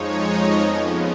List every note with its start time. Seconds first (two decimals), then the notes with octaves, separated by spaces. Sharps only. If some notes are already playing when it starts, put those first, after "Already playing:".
Already playing: F2 F3 G#3 D#4 C#5
0.10 D#5
0.58 F2 C#3 F3 B3